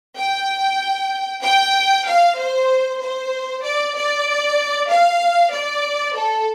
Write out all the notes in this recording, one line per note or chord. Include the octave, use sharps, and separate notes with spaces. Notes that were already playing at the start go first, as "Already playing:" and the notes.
G5
G5
F5
C5
C5
D5
D5
F5
D5
A4